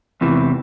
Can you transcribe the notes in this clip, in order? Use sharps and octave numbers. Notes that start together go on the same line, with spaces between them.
E2 C3 E3